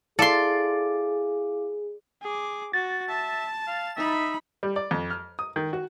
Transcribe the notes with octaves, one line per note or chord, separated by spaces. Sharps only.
E4 G#4 A4 D5 F5 C6 D6
G#4 D6
F#4 A6
E5 A5
F5
D#4 E5 B5
G3
D5
F2
F6
D#6
D#3
F#4